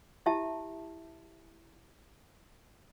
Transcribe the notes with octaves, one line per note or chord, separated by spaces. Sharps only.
E4 G4 E5 A5